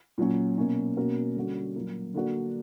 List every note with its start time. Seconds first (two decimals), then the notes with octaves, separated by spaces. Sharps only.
0.18 A#2 F#3 C#4
0.58 B2 A#3 C#4
0.96 B2 A#3 C#4 F#4 A#4
1.36 D3 G3 C#4 F#4
1.76 A#2 F#3 A#3
2.14 D3 A#3 D4 F#4 A#4